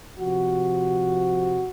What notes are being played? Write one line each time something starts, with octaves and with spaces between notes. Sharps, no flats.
C3 F3 F#4